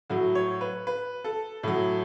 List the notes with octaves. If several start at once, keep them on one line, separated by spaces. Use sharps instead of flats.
A2 F#3 F#4
C#5
B4
B4
A4
A2 F#3